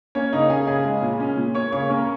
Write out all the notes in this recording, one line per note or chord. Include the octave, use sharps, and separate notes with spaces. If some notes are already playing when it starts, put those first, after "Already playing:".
A#3 C#4 C#5
C#3 D#4 D#5
C#4 G#4 G#5
C#3 G#4 G#5
G#3
A#2
C#4
A#2
A#3 C#5 C#6
C#3 C#5 C#6
A#3 C#4 A#4